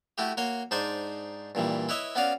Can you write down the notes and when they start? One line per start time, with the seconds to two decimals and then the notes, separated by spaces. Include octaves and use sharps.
0.18 A3 E4 F#4 G4
0.37 A#3 F#4 C#5 C6
0.71 G#2 D4 D#4 C5 D5 G#5
1.55 G2 A#2 E3 G3
1.89 E4 B4 C#5 D#5 E5
2.15 B3 C#4 F#4 D5 F5